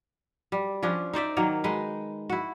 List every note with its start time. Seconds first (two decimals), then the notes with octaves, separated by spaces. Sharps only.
0.52 G3
0.83 F3 C#4 D4
1.13 D#4 C5 D5 E5
1.37 D#3 F#3 A#3
1.64 G#3 D#4 B4
2.30 E4 F#4